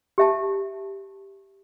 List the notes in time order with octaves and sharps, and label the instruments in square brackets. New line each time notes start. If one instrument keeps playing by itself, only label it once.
[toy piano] G4 E5 A5